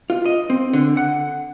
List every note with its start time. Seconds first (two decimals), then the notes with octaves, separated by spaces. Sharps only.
0.10 F4
0.26 D#5
0.50 C4
0.73 D3
0.97 F#5